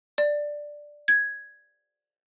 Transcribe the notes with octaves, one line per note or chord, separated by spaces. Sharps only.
D5
G#6